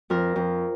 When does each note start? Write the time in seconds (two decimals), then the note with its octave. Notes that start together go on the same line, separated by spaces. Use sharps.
0.10 F2 A#4
0.36 F2